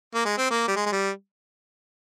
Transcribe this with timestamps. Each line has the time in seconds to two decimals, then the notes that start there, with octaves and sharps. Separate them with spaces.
0.15 A#3
0.25 G#3
0.38 C4
0.51 A#3
0.68 G3
0.76 G#3
0.86 G#3
0.92 G3